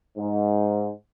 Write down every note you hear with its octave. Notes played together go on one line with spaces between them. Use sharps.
G#2